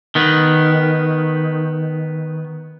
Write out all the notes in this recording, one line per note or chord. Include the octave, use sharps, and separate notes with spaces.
D#3 B3